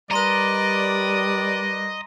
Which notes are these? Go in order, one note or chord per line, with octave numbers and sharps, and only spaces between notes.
G3 A#4 B4 D5 D#5 A#5 C6 D#7